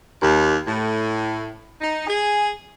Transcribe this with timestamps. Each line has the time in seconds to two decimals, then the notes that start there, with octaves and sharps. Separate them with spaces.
0.22 D#2
0.67 A2
1.81 D#4
2.07 G#4